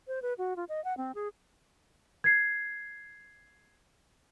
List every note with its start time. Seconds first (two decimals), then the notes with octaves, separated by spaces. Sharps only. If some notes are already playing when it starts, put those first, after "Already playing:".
0.08 C5
0.22 B4
0.38 F#4
0.56 F4
0.69 D#5
0.84 F#5
0.97 C4
1.15 G#4
2.24 G#6 C7